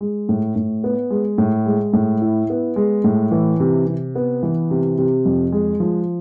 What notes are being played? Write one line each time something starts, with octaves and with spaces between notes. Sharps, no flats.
G#3
A2
A2
B3
G#3
A2
G#3
A2
E4
B3
G#3
A2
E3
C3
C3
B3
E3
C3
C3
F2
G#3
F3